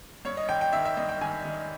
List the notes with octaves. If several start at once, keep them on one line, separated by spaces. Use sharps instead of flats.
G2 C#5
D#5
G#1 G5
G5
D#3 E5
E5
G2 D#5
G5
D#3 G#5
D#3